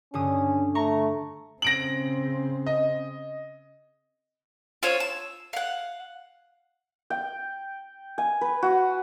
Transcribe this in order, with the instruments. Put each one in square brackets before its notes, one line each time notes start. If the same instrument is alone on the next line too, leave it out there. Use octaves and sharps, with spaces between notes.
[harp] G2 D3 D#6 [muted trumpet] C#4
[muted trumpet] A3 [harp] A#5 C#6
[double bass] C#3 C4 [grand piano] A#6 D7 F#7
[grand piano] D#5
[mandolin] F4 C5 C#5
E6
F5 F#5
[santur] G5
G#5
B4
F#4